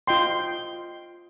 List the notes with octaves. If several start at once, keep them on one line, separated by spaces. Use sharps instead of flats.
F4 D#5 G5 C6